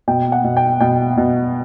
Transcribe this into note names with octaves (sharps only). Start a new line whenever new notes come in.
B2 G5
F#5
B2
G5
B2 G5
B2